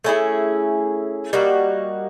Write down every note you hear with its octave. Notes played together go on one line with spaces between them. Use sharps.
A3 C#4 E4 G#4
G3 A#3 D#4 F#4